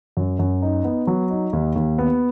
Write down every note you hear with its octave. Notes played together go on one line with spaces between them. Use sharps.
F#2
F#2
D#4
B3
F#3
D#4
D#2
D#2
B3